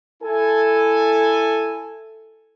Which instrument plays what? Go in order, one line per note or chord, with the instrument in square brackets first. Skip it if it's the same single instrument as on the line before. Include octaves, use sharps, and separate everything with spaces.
[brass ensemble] E4 A4 G#5